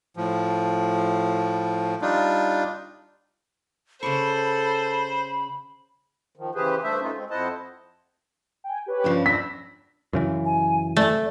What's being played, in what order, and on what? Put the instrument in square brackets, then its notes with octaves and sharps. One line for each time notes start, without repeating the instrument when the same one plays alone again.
[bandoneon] A2 F3
G3 D4 D#4 F4
[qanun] C#3 D5 C#6 [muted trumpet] A4 [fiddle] C5 [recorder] B5
[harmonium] D#3 F3
C#3 E3 G4 G#4 B4 C5
G2 A3 D4 C5 E5
A3 C#4 D#4 F4
G#3 C4
F2 E4 C5 D#5 F#5 A5
[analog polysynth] G5 G#5
G4 B4 C#5
[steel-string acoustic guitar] G2 C#3 F3
[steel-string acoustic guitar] D4 [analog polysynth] B5 E6 A#6 [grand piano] B6
[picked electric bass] F#2 C#3 E3
[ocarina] G#5
[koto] A3 [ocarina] D5